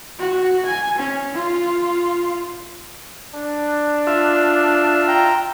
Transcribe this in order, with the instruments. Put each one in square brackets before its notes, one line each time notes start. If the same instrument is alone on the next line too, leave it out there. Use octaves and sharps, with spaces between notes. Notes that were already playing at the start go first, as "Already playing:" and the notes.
[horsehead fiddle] F#4
G#5
C#4
F4
[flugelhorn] D4
[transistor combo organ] F4 E5
[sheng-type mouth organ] G5 A#5